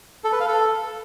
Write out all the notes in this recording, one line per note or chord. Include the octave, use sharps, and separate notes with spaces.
A4
B4
F5
A4